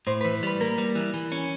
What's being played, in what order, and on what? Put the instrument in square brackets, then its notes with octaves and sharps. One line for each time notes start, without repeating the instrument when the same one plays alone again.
[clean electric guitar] A2 [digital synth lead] C5
[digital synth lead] B4
[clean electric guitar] E3
[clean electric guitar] G3 [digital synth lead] B4
[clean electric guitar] A#3 [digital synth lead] A#4
[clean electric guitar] G3
E3
E3
C#4